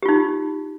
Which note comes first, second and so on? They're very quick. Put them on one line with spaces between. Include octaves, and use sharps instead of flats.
G4 F4 D#4